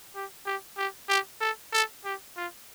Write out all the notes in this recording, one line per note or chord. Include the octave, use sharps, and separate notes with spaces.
G4
G4
G4
G4
A4
A4
G4
F4